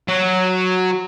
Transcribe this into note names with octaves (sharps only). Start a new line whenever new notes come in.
F#3